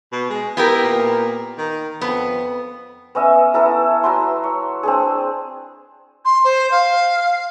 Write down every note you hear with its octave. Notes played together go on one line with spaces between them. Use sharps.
B2
G#3
B3 E4 G4 A#4
A#2
D#3
F2 B3
B3 C#4 D#5 E5
B3 E4 A4 A#4
F#3 B4 C6
C#5
C4 D4 G#4
C6
C5
F5